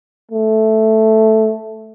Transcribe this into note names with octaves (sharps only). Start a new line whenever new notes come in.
A3